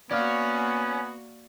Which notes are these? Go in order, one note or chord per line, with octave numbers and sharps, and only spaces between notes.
A#3 B3 C#4 F#4 D5 F5